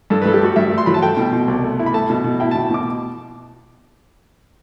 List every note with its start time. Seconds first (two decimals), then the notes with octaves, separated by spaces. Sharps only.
0.10 G2 A4
0.22 B4
0.25 G2 A4
0.34 G4
0.41 A3 F#4
0.56 G2 E5
0.71 A3
0.78 C6
0.86 F#3 B5
0.94 A5
1.02 A3 G5
1.17 B2
1.33 B2
1.48 C2
1.63 A3
1.79 E4
1.86 B5
1.94 A3 A5
2.10 B2
2.24 B2
2.40 E4 G5
2.51 A5
2.55 B2
2.71 B2 D6